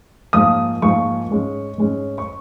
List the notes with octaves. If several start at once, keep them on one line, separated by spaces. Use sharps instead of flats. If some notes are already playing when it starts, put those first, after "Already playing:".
G#2 F3 A#3 D#6
G#2 F3 A#3 C#6
G#2 G#3 C#4
G#2 G#3 C#4
C#6